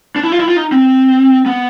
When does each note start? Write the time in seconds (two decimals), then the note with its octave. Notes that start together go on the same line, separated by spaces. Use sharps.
0.16 D4
0.23 E4
0.32 F4
0.40 E4
0.48 F4
0.56 D#4
0.72 C4
1.46 B3